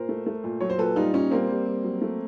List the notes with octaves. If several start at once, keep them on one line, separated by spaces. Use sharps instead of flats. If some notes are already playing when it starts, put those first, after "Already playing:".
Already playing: A#2 A#4 C5
A3
A3
A#2
F#3 C#5
C5
A#2 A4 B4
G3 D#4 F4
A#2 C#4 D#4
G3 A#3 C4
G3
G3
F#3
A3